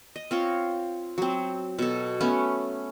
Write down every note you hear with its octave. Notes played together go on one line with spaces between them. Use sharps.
D#5
C4 F4 C#5
F#3 C4
B2 A4
A3 B3 C#4